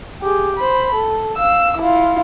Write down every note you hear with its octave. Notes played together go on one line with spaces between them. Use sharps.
G4 G#4
C5 B5
A4
F5 E6
E4 F4